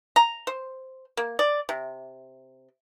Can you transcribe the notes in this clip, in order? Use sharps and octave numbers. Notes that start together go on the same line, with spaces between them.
A#5
C5
A#3
D5
C3